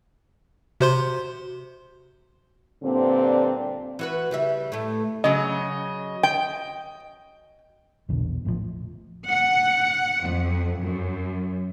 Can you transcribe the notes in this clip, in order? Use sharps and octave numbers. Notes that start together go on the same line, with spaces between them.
C3 F#4 C5 C6
G2 A#2 D3 C4
E3 F#4 B4
C#3 G3 E5
A2 A3
C#3 F#3 D#5
G5
A#1 E2 B2 D3
A1 A2 D3 F3
F#5
F2
F#2